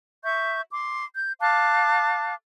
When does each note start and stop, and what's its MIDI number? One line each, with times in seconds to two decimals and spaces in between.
0.24 0.60 76
0.24 0.60 85
0.24 0.60 91
0.70 1.04 84
0.70 1.04 86
1.14 1.32 91
1.41 2.34 77
1.41 2.34 81
1.41 2.34 86
1.41 2.34 90